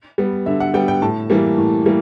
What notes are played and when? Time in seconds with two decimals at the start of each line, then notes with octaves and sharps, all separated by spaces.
0.18 G3 B3
0.46 D3 E5
0.60 F#5
0.74 G3 B3 G5
0.88 G5
1.02 A2 A5
1.30 E3 G3 A#3
1.58 A2
1.85 E3 G3 A#3